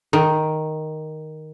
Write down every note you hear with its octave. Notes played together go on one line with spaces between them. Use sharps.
D#3